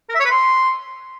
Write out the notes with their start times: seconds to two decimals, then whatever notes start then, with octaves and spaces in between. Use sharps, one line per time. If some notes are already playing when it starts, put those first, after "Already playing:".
0.09 A#4
0.15 E5
0.20 C#5
0.25 B4
0.30 C6